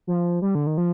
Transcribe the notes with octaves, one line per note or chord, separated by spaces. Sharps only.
F3
G3
D3
D#3
F3